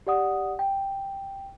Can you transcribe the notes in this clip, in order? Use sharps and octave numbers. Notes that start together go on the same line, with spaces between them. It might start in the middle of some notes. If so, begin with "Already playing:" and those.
G4 D5 F#5 D#6
G5